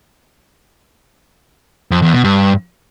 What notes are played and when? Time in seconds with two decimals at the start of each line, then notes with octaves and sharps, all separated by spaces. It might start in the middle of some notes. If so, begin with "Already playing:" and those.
1.91 F2
2.02 E2
2.13 B2
2.24 G2